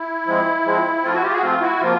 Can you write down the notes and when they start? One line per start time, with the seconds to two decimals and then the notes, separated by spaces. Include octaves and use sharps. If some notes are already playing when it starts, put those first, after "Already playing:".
Already playing: E4
0.26 F3 G#3 C4
0.65 F3 G#3 C4
1.04 F3 A3 C4 F4
1.12 E4 F#4
1.23 F4 G4
1.32 F#4 G#4
1.41 F3 A3 C4 F4
1.60 E4 F#4
1.80 C3 F3 A#3 F4